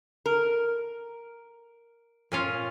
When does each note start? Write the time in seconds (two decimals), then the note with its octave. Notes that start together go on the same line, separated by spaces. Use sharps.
0.26 A#4
2.32 A#2 C#4 F4